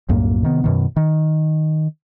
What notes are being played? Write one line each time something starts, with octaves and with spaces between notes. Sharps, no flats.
C2 F#2 A2 A#3
C3 D#3 B3
F#2 B2 D#3
D#3